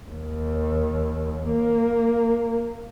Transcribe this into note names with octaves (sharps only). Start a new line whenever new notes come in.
D#2
A#3